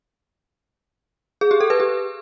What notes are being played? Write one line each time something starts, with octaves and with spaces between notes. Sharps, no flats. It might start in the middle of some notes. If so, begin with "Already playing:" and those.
G#4
G4
A4
B4
G4